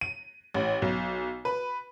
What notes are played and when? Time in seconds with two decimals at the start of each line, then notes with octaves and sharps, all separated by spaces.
0.01 D#7
0.54 A1
0.82 B1
1.45 B4